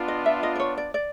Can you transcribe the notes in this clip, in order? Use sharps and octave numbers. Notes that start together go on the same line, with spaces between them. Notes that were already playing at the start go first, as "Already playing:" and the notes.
Already playing: B3 D4 F4
D#5
E5
D#5
D5
C#5
D5
D5